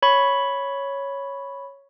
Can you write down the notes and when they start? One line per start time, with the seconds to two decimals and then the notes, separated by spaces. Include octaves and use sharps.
0.02 C#5 B5 C#6